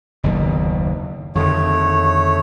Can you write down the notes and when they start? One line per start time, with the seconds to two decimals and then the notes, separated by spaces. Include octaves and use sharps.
0.23 F#1 D#2 B2
1.35 F2 D3 D#3 A3 C#5